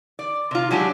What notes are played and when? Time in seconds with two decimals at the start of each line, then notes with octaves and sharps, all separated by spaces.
0.19 D5
0.51 C3 F4
0.71 F#3 G#3 D4 G4